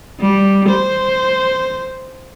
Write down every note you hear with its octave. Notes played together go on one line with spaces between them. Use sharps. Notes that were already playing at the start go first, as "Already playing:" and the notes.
G3
C5